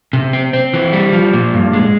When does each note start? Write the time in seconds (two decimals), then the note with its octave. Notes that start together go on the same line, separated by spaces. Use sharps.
0.13 C3
0.33 C4
0.53 C4
0.74 E3
0.93 G3
1.13 F3
1.34 A#2
1.54 G2
1.73 G#3